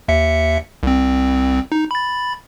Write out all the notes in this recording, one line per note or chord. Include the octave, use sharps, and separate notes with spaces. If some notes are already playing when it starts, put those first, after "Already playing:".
D#2 E5 C#7
C2 C4
D#4
B5 A6